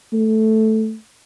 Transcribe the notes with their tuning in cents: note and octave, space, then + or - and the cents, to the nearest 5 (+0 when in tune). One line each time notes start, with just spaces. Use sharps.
A3 -5